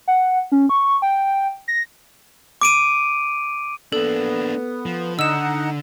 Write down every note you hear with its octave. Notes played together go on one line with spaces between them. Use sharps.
F#5
C#4
C#6
G5
A#6
D6 D7 D#7
A#3 B3 D4 A4
F3
D3 D#4 D#5 F#5 E6 E7